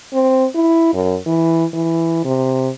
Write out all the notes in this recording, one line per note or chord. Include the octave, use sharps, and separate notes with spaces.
C4
E4
F#2
E3
E3
C3